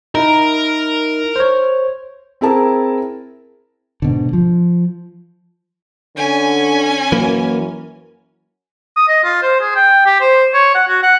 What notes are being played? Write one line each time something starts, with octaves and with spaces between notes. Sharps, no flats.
D#4 E4 A#4
C5 C#5
C4 E4 G#4 A#4 A5 A#5
G#2 B2 D3
F3
D3 C#4 G#5
F#2 E3 A#3
D#6
D#5
F4
C5
G#4
G5
G4
C5
C#5
F#5
F#4
F#5